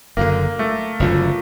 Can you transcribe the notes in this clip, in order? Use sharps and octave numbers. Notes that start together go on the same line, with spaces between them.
F#1 F#2 D3 A#3
A3
F#1 F#2 D3 F3